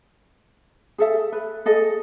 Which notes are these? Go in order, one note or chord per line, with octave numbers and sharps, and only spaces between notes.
G#4 A4 E5
B4
G#4 A4 D#5